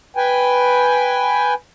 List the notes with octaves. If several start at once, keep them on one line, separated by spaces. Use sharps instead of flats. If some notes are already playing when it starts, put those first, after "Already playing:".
B4 G5 G#5